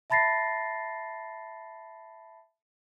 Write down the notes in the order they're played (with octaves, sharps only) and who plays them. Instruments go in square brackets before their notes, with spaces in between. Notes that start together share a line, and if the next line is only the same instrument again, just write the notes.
[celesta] E5 A5 B5 A6 A#6 C7